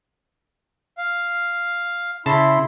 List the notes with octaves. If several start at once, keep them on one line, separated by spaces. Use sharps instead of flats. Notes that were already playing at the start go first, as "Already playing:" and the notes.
F5
C#3 E4 A5 C6